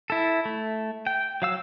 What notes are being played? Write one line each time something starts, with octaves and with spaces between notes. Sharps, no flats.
E4 A4
A3
G5
F#3 F5 E6